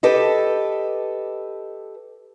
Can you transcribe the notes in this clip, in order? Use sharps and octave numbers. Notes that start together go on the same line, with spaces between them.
G4 A4 B4 D#5